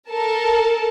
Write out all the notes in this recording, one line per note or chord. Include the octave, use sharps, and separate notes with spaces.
A4 A#4 A5